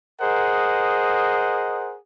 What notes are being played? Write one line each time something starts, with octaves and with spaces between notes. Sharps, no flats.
G#4 A#4 C5 D#5 F#5